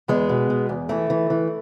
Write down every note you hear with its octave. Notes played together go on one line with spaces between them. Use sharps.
E2 G#3 B3
B2
B2
E2
E3 A3
E3
E3